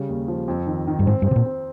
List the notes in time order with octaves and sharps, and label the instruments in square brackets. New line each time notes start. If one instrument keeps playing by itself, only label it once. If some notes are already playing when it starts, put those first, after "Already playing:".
Already playing: [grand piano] C#3 G3
D#2
F3
F2
D#3
D#3
[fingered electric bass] G2
[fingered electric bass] G#2 [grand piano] C4
[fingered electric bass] G2
[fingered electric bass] C3 [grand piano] C4
[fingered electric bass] A#2
[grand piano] C4